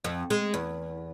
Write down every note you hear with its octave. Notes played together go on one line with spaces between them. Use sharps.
F2
G#3
E2